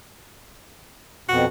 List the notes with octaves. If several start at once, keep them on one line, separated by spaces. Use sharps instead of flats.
F2 B2 F#4